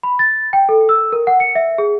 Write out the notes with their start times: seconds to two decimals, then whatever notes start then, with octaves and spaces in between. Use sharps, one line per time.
0.03 B5
0.19 A6
0.53 G5
0.69 A4
0.89 E6
1.12 A#4
1.27 F#5
1.40 C#7
1.55 E5
1.78 G#4